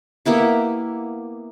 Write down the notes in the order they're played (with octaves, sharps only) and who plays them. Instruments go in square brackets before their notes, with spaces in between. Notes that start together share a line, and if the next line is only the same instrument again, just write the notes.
[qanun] A#3 B3 E4 G4